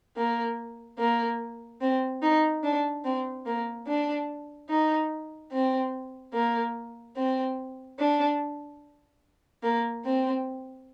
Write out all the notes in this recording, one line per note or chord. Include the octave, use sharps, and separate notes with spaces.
A#3
A#3
C4
D#4
D4
C4
A#3
D4
D#4
C4
A#3
C4
D4
A#3
C4